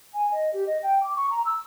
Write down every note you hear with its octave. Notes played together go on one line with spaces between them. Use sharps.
G#5
D#5
G4
D#5
G5
D6
C#6
A#5
E6